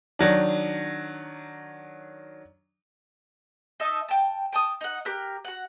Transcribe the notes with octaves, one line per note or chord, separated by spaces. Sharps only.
D#3 F#3 D4
D#4 D#5 E5 A5
G5 A5
G5 A5 D#6
D#4 F#5
G4 A#4 F6 F#6
F#4 F#5